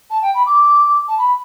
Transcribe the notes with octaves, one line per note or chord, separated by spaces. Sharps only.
A5
G5
B5
D6
A5
B5